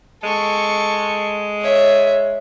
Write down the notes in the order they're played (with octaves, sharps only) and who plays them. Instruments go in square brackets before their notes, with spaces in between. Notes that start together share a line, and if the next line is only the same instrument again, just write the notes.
[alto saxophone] G#3 [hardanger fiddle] A4 C#6
[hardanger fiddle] C#5 E5